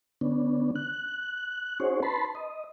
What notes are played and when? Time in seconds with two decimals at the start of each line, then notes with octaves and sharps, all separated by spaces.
0.21 D3 B3 C#4 D4
0.75 F#6
1.80 C#4 D#4 F#4 G#4 C5 C#5
2.03 B4 A5 B5 C6
2.35 D#5